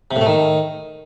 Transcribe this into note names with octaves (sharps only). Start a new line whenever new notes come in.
C3
A2
A3
D#3